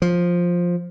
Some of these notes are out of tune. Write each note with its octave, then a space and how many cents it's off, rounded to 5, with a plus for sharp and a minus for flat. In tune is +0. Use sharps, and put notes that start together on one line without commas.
F3 +5